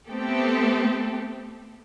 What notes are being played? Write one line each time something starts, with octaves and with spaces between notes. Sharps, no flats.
A3 B3 C4 G4 A4